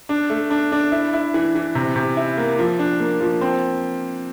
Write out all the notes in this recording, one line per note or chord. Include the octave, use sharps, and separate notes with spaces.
D4
A3
D4
D4
E4
E4
E3
E3
C3
C3
E4
A#3
F3
D4
A#3
F3
C4